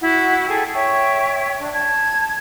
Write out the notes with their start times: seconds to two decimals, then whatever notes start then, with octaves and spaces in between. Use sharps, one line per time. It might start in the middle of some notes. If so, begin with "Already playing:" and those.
0.01 E4 F#4 F#5
0.48 G#4 A4 G5
0.73 C#5 E5 G5 C#6
1.57 D4
1.74 A5 G#6